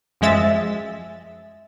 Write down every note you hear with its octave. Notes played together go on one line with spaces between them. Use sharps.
F#2 F3 G#3 E5 A6